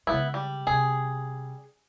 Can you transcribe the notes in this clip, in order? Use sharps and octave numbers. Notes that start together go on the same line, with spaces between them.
C#3 G#3 B3 E4
G3
C3 C#4 G#4